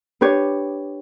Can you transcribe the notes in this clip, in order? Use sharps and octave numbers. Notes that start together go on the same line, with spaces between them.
D4 G4 B4 C#5